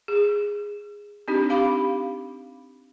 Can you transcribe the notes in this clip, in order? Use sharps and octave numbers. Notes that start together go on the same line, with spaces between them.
G#4
C4 D4 D#4 G4
G4 F5 B5 D6